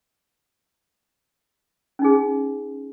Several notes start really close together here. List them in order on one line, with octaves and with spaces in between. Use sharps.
C#4 D#4 G#4